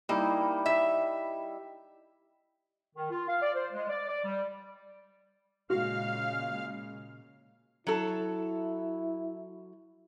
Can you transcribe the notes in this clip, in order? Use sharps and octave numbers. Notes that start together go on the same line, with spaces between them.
G3 A#3 D#4 E4
E5
D#3
F4
F5
D5
C5
G#3
D5
D5
G3
A#2 C#3 G#3 F#4 F5 F6
F#3 E4 A4